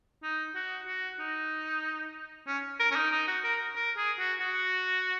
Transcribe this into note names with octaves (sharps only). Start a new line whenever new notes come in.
D#4
F#4
F#4
D#4
C#4
A#4
C#4
D#4
D#4
F#4
A#4
A#4
G#4
F#4
F#4